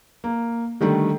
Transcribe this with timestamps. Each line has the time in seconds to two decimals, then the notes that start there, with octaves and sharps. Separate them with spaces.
0.24 A#3
0.81 D3 D#3 G3 A3